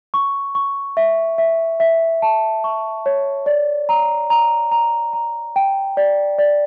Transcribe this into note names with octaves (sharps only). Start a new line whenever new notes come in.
C#6
C#6
E5
E5
E5
A5
C#6
C#5
D5
A#5
A#5
A#5
A#5
G5
D5
D5